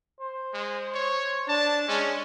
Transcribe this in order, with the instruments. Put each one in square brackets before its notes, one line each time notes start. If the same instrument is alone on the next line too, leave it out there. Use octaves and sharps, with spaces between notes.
[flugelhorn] C5
[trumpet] G#3
C#5
[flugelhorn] D4 [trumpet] A5
[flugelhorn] G#3 [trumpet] C#4